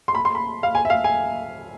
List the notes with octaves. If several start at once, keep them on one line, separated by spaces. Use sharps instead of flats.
C6
B5
C6
B5
F5
G#5
E5
F5
G#5